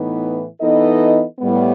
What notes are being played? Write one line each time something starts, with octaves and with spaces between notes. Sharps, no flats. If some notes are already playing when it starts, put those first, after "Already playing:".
Already playing: A2 E3 B3 D#4
E3 B3 D#4 A4 D#5
A2 G3 B3